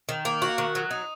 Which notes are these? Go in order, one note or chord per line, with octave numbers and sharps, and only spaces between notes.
D#3
A#3
F#4
D#3
F#3
D#4